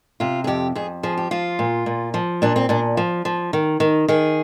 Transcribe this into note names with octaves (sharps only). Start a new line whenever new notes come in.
C3 F4
G#4
F2 G4
F2 G#4
F3 G#4
G4
F3 F4
A#2
A#2
F3
A#2 D4
C4
A#2 D4
F3
F3
D#3
D#3
D#3 G#4